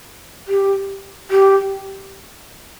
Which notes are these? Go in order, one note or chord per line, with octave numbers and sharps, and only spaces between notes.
G4
G4